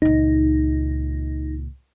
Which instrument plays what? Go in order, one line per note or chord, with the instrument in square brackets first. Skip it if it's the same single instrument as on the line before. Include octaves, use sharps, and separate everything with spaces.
[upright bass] C#2 A#2 [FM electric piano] D#4